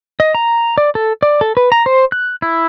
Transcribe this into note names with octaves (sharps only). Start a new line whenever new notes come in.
D#5
A#5
D5
A4
D5
A4
B4
A#5
C5
F#6
E4